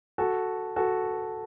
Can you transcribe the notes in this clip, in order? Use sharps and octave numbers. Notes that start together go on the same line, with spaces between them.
F#4 A4
F#4 A4